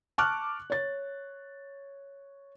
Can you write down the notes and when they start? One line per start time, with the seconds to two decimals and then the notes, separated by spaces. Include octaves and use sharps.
0.18 A5 C#6 D6 F6 F#6
0.70 C#5 A6